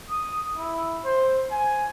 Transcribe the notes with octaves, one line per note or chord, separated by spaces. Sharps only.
D#6
E4
C5
G#5